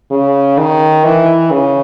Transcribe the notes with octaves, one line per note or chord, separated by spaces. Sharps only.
C#3
D#3
E3
C#3